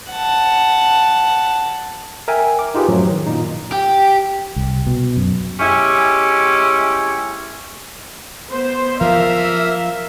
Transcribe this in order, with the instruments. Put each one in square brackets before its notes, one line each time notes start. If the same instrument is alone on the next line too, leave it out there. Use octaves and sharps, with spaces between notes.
[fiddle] F#5 A5
[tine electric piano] A#4 E5 G5 G#5
D6
D#4 F4 G4 G#4 B4
F#2 A2 F3 F#3
D#3
A#2 D#4
[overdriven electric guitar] G4
[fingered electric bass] C2
B2
F#2
[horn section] G#3 C#4 E4 G4
[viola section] B3 C5
[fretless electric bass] F3 [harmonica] A#4 F5 [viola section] E5